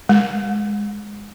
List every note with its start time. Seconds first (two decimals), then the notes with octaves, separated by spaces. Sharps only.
0.09 G#3